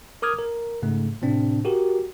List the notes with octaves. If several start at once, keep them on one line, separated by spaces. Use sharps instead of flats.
A#4 D6 D#6 F6 G#6
A#4
G#2 C#3 A3
A2 C3 C4 D4
F#4 G4 A#4